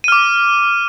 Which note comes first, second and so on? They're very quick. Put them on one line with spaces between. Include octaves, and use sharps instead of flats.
D#7 F6 D6